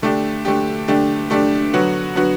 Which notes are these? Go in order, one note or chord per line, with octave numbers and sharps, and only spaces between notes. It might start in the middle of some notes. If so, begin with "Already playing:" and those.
D3 A3 D4 G4
D3 A3 D4 G4
D3 A3 D4 G4
D3 A3 D4 G4
D3 F#3 B3 F#4
D3 F#3 B3 F#4